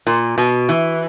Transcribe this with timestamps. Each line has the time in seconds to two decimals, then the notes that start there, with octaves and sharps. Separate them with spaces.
0.07 A#2
0.38 B2
0.69 E3